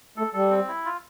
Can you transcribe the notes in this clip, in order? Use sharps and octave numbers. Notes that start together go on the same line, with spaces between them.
A3 A4
G3 A4
C4
E4
F4